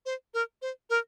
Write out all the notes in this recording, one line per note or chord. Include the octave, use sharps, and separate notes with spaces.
C5
A#4
C5
A#4